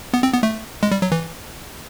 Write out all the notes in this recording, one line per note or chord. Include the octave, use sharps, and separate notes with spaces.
B3
C4
B3
A3
G#3
G3
F#3
E3